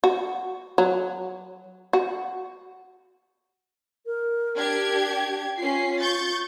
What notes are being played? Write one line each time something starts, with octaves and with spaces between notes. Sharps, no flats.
F#4
F#3
F#4
A#4
D4 G4 G#6
G5
C#4 F4 C7
C#6 G6 A6